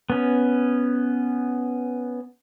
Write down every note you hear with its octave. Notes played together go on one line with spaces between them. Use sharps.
B3 C#4